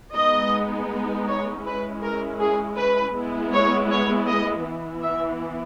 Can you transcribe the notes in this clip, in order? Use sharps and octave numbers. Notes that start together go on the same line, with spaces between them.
G#3 B3 D#4 D#5
C#5
G#3 C#4 E4 B4
A#4
G#4
B4
G#3 B3 E4
C#5
C#5
D#5
E3 B3 E4
E5